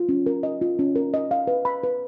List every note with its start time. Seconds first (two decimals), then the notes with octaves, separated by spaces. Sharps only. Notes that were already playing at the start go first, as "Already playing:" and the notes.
Already playing: F4
0.09 C#4
0.26 A#4
0.43 D#5
0.61 F4
0.79 C#4
0.96 A#4
1.14 D#5
1.31 F5
1.47 B4
1.65 B5
1.83 B4